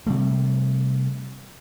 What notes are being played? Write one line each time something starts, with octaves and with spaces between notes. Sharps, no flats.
C3 G3 A3